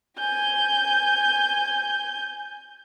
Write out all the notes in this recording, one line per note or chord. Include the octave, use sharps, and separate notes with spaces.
G#5 G6